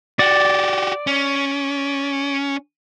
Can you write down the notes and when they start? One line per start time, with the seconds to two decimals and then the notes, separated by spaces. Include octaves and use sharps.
0.19 F#4 G4 D5
1.07 C#4